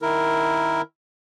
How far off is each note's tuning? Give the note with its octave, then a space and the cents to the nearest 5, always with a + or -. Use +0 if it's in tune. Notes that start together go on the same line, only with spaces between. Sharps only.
D#3 +0 E4 -5 A#4 +0